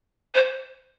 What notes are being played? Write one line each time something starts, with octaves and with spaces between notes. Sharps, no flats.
C5